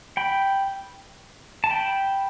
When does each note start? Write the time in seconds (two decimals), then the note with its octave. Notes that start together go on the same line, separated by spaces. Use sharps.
0.17 G5 B5
1.64 A5
1.70 G5 B5